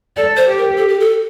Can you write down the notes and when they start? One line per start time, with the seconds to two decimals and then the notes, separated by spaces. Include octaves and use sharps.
0.17 A4 D5
0.37 C5
0.48 G4
0.58 A#4
0.77 A4
0.88 G4
1.00 A4